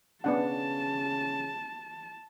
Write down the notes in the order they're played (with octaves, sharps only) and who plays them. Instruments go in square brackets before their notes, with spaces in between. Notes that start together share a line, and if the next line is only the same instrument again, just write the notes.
[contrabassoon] C#3 [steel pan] B3 D4 F#5 [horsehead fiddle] A5